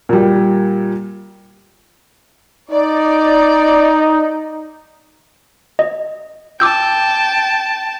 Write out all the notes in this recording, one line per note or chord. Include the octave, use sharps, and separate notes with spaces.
A#2 G3
D#4 D5
D#5
G5 A5 D6 E6 G6